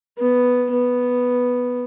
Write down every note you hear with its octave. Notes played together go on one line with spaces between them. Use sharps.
B3
B3